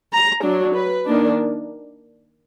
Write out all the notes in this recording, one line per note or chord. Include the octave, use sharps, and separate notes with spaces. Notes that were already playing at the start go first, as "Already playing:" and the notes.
A#5
F#3 D4
B4
D#3 A#3 D4